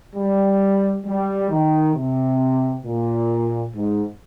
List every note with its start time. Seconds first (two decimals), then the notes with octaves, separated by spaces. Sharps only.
0.16 G3
1.06 G3
1.50 D#3
1.95 C3
2.85 A#2
3.75 G#2